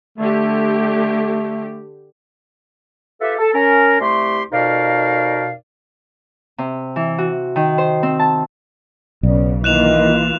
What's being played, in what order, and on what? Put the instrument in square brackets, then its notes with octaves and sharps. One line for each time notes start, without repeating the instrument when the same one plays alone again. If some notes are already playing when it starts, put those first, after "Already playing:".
[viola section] D3 G4 [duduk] A3
[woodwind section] F4 G4 A4 B4 E5
A4
C#4 A#4
C2 A3 G4 C6
F2 B2 D#4 A#4 D5 F5
[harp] C3
E3
F#4
D#3
C5
C4
A5
[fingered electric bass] B1 [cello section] C#3 [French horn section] F#3 B3 D5
[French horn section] D#3 D#5 [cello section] E3 A#3 F4 [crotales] F#6 E7 F7